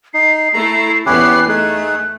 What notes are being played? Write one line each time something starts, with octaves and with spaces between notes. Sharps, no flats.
D#4 C7
A3 E4 A#5
E2 B3 C#4 E4 G4 F#6 C7
A3 D#4 G#4 F#6